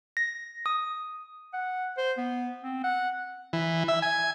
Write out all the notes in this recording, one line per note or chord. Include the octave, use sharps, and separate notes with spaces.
A#6
D#6
F#5
C5
B3
C4
F#5
E3
E5
G#5